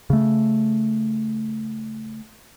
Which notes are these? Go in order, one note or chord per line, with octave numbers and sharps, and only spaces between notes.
C#3 A3